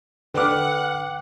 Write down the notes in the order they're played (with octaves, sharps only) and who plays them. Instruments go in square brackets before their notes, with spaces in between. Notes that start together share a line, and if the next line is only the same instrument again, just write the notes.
[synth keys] D3 [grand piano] B4 E6 F6 [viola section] F#5 [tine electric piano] G5 D6